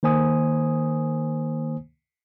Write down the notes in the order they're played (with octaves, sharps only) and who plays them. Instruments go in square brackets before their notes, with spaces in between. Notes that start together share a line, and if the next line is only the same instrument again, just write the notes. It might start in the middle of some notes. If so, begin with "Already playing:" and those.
[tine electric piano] D#3 A#3 C5 G#5 D#6